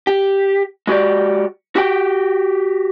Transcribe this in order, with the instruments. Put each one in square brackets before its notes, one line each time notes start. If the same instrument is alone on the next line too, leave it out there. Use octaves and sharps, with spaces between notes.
[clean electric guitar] G4
G#3 F#4 G4 D5
F#4 G4 G5